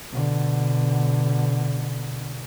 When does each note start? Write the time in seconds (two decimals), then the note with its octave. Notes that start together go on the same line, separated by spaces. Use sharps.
0.12 B2 D3